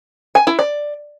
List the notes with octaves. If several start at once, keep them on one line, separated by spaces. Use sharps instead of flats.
G#5
E4
D5